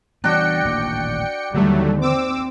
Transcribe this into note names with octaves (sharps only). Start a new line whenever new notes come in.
E3 G3 B3 D4 F#4 G5 C#7
D#1 A1 A#3
D#2 D3 E3 F#3 G3 A3
C4 D6 E6